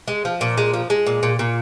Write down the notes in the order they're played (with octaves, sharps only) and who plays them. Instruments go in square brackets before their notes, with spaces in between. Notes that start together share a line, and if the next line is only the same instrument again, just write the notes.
[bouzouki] G#3
F3
A#2
G#3
F3
G#3
A#2
A#2
A#2